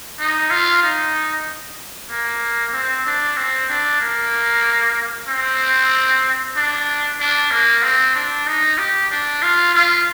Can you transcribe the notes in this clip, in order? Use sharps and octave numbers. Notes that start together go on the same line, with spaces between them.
D#4
F4
D#4
A#3
C4
D4
C4
D4
A#3
C4
D4
D4
A#3
C4
D4
D#4
G4
D4
F4
F4